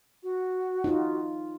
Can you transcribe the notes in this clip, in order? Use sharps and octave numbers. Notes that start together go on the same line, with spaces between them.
F#4
D#4 F4